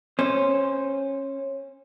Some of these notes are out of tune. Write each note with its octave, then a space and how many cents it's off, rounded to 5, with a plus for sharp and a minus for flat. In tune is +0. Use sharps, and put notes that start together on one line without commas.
C#4 -20 C5 +0